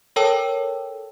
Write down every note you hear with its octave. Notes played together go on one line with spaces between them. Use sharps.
A4 A#4 C#5 G5 A5 E6